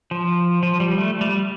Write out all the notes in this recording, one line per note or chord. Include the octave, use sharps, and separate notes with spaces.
F3
F3
G3
A3
G3